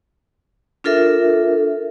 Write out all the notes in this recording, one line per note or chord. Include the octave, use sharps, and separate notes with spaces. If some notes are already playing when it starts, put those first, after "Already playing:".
D4 F4 A4 A#4 E5